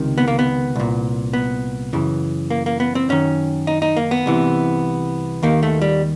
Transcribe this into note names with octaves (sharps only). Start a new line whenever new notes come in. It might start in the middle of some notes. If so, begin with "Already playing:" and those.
Already playing: C#2 C3 D#3
B3
A#3
B3
C2 A#2
B3
F#2 C#3 E3
A#3
A#3
B3
C4
F#2 D#3 C#4
D#4
D#4
A#3
B3
C2 C3 E3
D#2 D#3 A#3
A3
G3